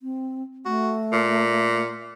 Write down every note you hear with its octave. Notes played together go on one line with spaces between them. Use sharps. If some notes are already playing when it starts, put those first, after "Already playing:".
C4
A3 F#4
A#2